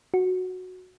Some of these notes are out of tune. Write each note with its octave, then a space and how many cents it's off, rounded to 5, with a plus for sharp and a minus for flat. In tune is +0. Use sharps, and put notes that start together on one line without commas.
F#4 -10